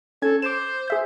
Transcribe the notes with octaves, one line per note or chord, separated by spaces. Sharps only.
C#4 A4 G#6
C5 D6 E7
G#4 E5 G6